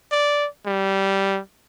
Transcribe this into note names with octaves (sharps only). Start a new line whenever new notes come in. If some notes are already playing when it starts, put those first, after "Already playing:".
D5
G3